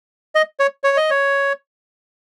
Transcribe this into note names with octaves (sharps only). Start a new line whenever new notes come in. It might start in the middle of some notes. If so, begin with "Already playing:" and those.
D#5
C#5
C#5
D#5
C#5